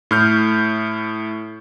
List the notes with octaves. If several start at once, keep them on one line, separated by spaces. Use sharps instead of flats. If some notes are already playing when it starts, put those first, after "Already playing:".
A2 F6 G6